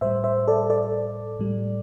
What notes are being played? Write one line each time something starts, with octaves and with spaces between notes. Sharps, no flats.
A2 G3 C5 E5
C5 E5
A4 D5
A4 D5
A2 G3